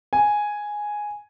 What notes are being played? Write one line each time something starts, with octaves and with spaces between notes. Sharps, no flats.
G#5